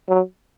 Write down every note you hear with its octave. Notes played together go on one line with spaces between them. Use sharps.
F#3